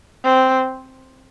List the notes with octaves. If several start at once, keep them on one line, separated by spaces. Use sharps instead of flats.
C4